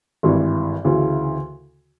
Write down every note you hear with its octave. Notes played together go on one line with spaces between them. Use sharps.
G#1 G2 E3 G3
D2 C#3 E3